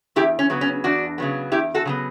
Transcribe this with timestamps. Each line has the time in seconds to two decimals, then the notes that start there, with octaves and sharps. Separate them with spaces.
0.16 E2 E4 G4
0.39 C#4
0.50 C#3 F#3 B3
0.61 C#4
0.84 E2 D4 F#4
1.18 C#3 F#3 B3
1.51 E2 E4 G4
1.74 F#4 A4
1.85 C#3 F#3 B3